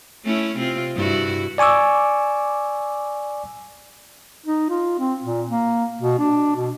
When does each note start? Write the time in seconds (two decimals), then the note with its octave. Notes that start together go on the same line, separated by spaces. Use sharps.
0.25 A3 C#4 E4
0.58 C3 C4 F4
0.95 G2 E4 F#4
1.58 D5 G#5 C#6 D6 E6
4.46 D#4
4.70 F4
4.99 C4
5.23 A#2
5.49 A#3
6.01 B2
6.19 D4
6.56 B2